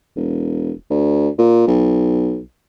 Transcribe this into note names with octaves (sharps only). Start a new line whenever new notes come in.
E1
D2
A#2
B1